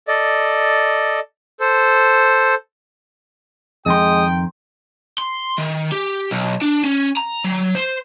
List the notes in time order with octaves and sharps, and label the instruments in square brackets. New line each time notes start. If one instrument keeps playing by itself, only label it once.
[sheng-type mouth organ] A4 D5 D#5
A4 C5
[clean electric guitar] F2 D#3 C6 [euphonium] G#3 [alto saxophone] G5 [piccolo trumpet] D#6
[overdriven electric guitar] C6
D#3
G4
B1
D4
C#4
A#5
F#3
C5